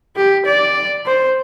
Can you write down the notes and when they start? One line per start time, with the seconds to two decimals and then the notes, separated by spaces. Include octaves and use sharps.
0.16 G4
0.46 D5
1.06 C5